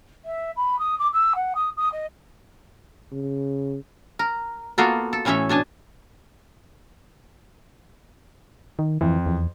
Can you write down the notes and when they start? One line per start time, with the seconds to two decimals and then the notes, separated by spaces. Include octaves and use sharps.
0.25 E5
0.56 B5
0.79 D#6
0.99 D6
1.13 E6
1.35 F#5
1.55 D#6
1.77 D#6
1.92 D#5
3.12 C#3
4.19 A#4
4.78 A#3 B3 F4 F#4 A4
5.13 A4
5.25 A2 E3 C#4 C#5 E5
5.49 B2 D4 G#5 A5
8.79 D#3
9.01 F2 E3
9.26 E2